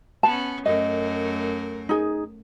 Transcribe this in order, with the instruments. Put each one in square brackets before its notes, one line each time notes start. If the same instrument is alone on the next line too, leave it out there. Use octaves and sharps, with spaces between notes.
[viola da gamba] B3 C#4 [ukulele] A5
[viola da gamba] F#2 A3 A#4 [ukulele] D#5
[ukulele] D#4 G#4